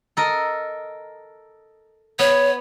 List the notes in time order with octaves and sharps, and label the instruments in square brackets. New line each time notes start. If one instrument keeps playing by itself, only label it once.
[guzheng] A4 A#4 D#5
[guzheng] B3 [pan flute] C#5